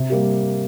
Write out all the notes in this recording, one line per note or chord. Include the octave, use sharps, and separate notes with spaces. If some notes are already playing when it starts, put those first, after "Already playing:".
Already playing: C3
G3 A#3 G4